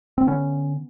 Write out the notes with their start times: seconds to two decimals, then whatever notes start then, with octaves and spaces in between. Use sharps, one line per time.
0.18 C4
0.27 D3 B3 C#4